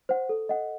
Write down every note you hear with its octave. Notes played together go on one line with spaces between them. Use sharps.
C5 F#5
A4
D#5 F#5